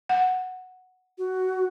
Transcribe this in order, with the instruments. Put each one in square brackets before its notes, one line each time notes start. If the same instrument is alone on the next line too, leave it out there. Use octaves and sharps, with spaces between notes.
[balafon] F#5
[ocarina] F#4